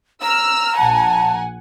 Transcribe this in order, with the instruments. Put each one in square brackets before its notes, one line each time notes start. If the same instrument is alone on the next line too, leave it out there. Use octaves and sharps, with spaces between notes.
[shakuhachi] A#5 [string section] E6 F6
[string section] A#1 F#5 G#5 [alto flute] A5